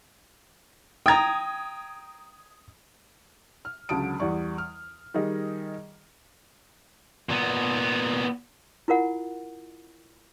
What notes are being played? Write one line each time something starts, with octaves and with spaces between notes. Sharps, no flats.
G5 A#5 D#6 G#6
F6
C#2 D3 F#3 A5 D#6 D7
E2 G3 D5 C#6
F6
D#3 G3 G#4 D#5
A#2 B3
E4 F4 A#4 F#5